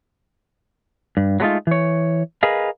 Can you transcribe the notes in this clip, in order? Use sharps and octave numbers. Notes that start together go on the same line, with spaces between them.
G2
F#3 G#3 A3 C4 D#4 F4
E3 C#5
G#4 A#4 B4 D#5 F5